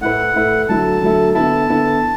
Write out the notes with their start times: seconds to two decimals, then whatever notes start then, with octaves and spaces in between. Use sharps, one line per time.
0.01 A2 A3 E4 B4 F#5
0.34 A2 A3 E4 B4
0.68 D3 F#3 A3 E4 A5
1.01 D3 F#3 A3 E4
1.35 D3 B3 E4 A5
1.69 D3 B3 E4